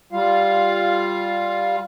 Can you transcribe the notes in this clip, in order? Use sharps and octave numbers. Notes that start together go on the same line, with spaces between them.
G3 F4 F5